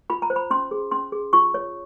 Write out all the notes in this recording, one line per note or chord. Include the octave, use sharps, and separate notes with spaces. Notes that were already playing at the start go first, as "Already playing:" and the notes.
F4 B5
A#5
C5
B5
C#4 C6
G#4
C#4 C6
G#4
F4 C#6
C#5